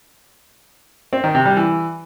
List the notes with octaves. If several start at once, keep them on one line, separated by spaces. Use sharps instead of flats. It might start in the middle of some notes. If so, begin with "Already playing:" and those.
C4
D#3
C3
G3
E3